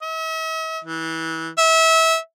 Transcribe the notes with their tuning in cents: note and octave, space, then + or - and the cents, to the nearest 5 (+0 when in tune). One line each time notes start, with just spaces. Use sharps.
E5 -45
E3 -25
E5 -25